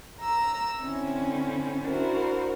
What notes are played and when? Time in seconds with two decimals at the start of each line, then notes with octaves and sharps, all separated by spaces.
0.20 A#5 E6
0.82 D3 C4 C#4 E4
1.85 D4 E4 F#4 A#4 C5